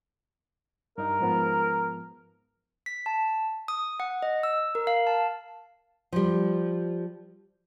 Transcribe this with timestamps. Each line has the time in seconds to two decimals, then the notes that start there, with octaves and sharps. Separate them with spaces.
0.98 G2 D#4 A#4
1.21 G#2 F3 B3
2.86 B6
3.06 A5
3.68 D#6
4.00 F#5
4.22 D#5
4.43 E6
4.75 A#4
4.87 F5
5.07 A5
6.12 F3 G3